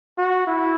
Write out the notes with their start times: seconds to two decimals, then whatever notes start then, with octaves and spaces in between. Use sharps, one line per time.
0.18 F#4
0.47 E4